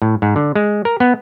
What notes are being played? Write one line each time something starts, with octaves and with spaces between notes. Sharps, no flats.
A2
G#2
D3
G#3
A#4
B3